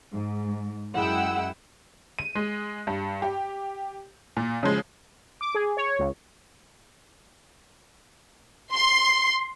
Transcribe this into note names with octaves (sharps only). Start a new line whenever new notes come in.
G#2
F#2 G#3 E4 F#5 G5 E6
D#7
G#3
G2
G4
A#2
C#3 F3 G#3
D6
G#4
C#5
C#2
C6